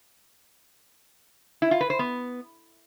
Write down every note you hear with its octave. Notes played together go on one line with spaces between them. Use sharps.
E4
F4
B4
C5
B3